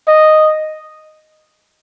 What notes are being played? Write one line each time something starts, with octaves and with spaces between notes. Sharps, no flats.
D#5